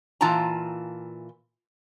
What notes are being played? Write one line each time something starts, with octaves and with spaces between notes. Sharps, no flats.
A#2 E3 F4 G5 A5 A#5